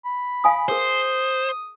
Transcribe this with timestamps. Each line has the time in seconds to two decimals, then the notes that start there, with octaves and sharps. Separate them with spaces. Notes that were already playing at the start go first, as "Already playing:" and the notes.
0.05 B5
0.44 F5 G#5 D#6
0.69 G#4 A#4 C5 D#6